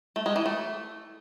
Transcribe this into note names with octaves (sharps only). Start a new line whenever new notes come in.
A3
G#3
E3
A3